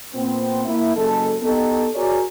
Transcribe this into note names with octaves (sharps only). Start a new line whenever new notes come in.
A#2 B3 C4
A#3 E4
F#1 G#3 A4
B3 D#4 G4 A4
F#4 G#4 A#4 C#5 D5